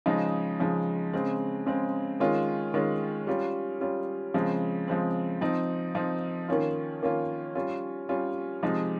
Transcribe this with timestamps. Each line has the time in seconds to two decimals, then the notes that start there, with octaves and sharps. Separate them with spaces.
0.06 C#3 F3 G#3 D#4
0.60 C#3 F3 G#3 D#4
1.13 C#3 G#3 C4
1.66 C#3 G#3 C4
2.20 D#3 G#3 C#4 F4
2.74 D#3 G#3 C#4 F4
3.27 G3 C#4 F4
3.81 G3 C#4 F4
4.34 C#3 F3 G#3 C4
4.88 C#3 F3 G#3 C4
5.41 F3 C4 D#4
5.95 F3 C4 D#4
6.48 D#3 A#3 C#4 F4
7.02 D#3 A#3 C#4 F4
7.55 G3 C#4 F4
8.09 G3 C#4 F4
8.62 C3 F3 G#3 D#4